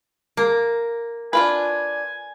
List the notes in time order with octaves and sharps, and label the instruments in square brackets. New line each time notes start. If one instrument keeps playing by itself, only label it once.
[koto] A#3
[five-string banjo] D4 F4 B4 [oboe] G#5